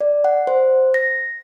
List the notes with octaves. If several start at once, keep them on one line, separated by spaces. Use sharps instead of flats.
D5
F#5
C5
A#6